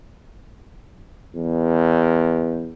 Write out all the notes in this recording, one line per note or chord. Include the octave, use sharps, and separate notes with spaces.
E2